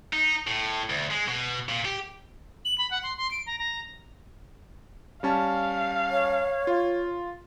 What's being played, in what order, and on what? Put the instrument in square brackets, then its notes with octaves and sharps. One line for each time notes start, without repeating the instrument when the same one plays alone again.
[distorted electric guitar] D#4
A2
D2
G#3
B2
A#2
G4
[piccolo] F#7
B5
F#5
C6
C6
D7
A#5
A#5
[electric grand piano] G3 C#4 A5 [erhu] F5
[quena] C#5
[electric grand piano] F4